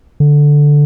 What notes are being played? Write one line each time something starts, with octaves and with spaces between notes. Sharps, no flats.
D3